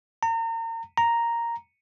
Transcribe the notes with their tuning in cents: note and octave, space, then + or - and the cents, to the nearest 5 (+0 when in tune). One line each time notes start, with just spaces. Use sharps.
A#5 -35
A#5 +0